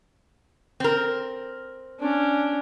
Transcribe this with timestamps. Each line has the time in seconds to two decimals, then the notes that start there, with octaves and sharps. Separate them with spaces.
0.80 C4 A#4
2.00 C#4 D4